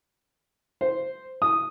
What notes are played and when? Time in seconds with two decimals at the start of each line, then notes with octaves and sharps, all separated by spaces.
0.81 C5
1.42 D#6